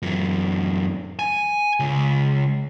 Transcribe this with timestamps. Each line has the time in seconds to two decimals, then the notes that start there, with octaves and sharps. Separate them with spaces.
0.02 F#2 E3
1.19 G#5
1.80 C#2